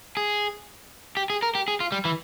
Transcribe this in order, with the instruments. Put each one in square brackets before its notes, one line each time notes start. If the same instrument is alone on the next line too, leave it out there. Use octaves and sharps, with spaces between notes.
[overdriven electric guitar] G#4
G4
G#4
A#4
G4
G#4
F4
G3
E3